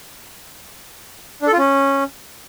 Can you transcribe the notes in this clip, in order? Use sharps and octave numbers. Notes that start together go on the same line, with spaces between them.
D4
A4
F4
C#4